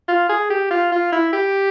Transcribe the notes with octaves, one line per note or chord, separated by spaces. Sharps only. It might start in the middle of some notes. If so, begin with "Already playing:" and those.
F4
G#4
G4
F4
F4
E4
G4